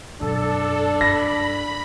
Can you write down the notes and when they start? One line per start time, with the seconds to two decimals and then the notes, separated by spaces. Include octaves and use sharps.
0.21 F#2 B2 D4 A4
1.01 G2 B5 A#6